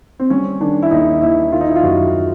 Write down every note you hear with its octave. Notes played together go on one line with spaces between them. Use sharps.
C4
G3 C#4
D#3 D4
E4
D#2 D#4
D#2 E4
D#3 F4
D#4
E4
F4
F#2 F#4